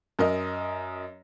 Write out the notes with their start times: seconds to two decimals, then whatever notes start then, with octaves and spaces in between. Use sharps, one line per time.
0.19 F#2 A#4 D#5